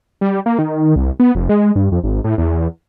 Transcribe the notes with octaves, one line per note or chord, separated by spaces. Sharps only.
G3
A#3
D#3
C2
B3
F1
G#3
G2
F2
G#1
A2
E2